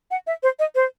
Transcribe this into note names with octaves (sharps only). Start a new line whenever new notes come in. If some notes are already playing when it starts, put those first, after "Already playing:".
F#5
E5
C5
D#5
C5